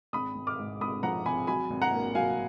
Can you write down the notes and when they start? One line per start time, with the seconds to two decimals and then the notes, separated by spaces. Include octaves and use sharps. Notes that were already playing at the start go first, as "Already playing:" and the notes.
0.13 G#1 B5 D#6
0.35 G#1
0.47 D6 F6
0.58 G#2
0.80 G#1 B5 D#6
1.03 F3 F#5 A#5
1.25 G#1 G#5 B5
1.47 F#3 G#5 B5
1.70 G#1
1.82 F#5 A#5
1.92 A#3
2.15 F#3 F5 G#5